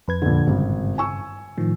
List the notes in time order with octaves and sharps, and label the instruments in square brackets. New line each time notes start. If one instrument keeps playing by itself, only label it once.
[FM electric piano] F2 B4 G#6
[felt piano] A#1 D3
[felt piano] G#1 [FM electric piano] G2 C#3
[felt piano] G#5 C#6 E6
[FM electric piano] A2 D#3 F3